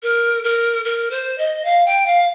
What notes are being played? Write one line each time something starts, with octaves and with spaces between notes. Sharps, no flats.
A#4
A#4
A#4
C5
D#5
F5
G5
F5